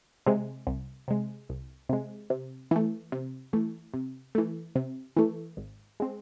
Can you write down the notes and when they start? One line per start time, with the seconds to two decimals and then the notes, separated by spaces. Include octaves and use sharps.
0.26 C3 G#3
0.67 C2
1.08 C3 G#3
1.49 C2
1.89 C3 G#3
2.30 C3
2.71 E3 A3
3.12 C3
3.53 E3 A3
3.94 C3
4.35 E3 A3
4.76 C3
5.17 E3 A3
5.57 G#1
6.00 G#3 C4